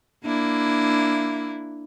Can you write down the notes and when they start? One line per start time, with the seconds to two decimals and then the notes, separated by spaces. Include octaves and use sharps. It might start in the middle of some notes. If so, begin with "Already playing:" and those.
0.25 A#3 D4 E4